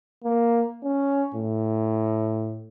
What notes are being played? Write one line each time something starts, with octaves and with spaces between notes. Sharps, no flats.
A#3
C#4
A2